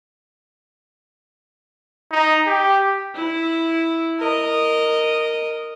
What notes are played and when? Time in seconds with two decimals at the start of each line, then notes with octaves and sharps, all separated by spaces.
2.12 D#4
2.46 G4
3.15 E4
4.19 A#4 D#5